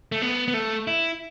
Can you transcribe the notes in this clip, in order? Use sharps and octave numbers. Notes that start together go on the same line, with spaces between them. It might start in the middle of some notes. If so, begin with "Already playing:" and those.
A3
B3
B3
A3
E4